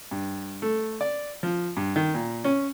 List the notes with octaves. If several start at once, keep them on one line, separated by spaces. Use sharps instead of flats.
G2
A3
D5
F3
G2
D#3
A#2
C#4